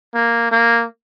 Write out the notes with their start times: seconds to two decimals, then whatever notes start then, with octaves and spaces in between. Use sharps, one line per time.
0.15 A#3
0.52 A#3